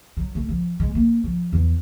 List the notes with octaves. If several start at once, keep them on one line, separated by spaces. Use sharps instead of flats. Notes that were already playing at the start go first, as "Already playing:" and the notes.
F#3
A3
F3
G#3
A#3
F3
E2